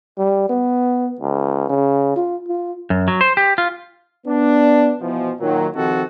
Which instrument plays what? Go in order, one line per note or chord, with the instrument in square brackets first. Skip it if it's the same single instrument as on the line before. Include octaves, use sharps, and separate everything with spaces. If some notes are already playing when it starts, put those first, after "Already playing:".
[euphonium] G3
B3
C#2
C#3
F4
F4
[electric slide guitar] F#2
F#3
C5
G4
F4
[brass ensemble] B3 D4
B2 E3 F3
A#2 D#3 F#3
C3 D#3 F3 C4 F#4 A4